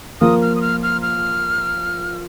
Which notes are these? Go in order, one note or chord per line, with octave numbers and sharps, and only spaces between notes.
F3 A#3 F4 A#4 D#6
F6
D#6
F6
F6
F6